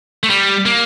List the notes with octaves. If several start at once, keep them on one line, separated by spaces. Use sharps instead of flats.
A3
G3
A#3